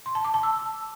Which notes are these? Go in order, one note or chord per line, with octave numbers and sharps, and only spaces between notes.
C6
A5
D6
A5
E6